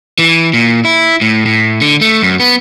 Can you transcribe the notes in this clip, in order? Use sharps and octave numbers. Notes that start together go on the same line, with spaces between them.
E3
A#2
E4
A2
A2
D3
A3
F#2
B3